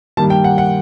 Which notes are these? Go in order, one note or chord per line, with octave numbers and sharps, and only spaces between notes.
G2 D#3 G3 A#3 A5
G5
F#5
F#5